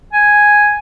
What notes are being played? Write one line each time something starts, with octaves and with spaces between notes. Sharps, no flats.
G#5